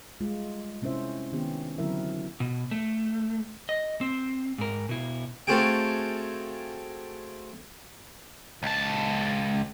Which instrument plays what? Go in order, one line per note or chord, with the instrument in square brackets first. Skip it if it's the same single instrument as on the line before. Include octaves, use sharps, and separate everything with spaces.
[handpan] G3 G#3 F4
C3 C4 C#4 E4 C5 E5
D#3 B3 C#4 G4
D3 F#3 C4 E4 A#4 E5
[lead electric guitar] B2
A3
D#5
C4
G#2 A#4
B2 E4
[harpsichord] A3 C4 F4 F#4 G#4 G5
[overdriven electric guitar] C#2 A5